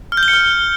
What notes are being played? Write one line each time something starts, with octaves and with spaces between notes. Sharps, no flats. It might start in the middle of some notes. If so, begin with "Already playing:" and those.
F6
G6
G7
C#7
F6